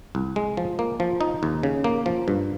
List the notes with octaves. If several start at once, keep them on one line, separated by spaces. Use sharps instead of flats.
C2
G#3
F3
A#3
F3
D#4
D#2
C#3
A#3
F3
G2